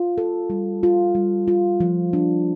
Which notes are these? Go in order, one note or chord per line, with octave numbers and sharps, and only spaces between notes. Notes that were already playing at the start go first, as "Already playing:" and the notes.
Already playing: F4
A4
G3
F4
G3
F4
F3
D4